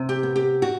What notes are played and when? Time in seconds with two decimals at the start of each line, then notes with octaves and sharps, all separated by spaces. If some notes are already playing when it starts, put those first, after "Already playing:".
Already playing: C3
0.09 G4
0.23 B3
0.36 G4
0.62 F#4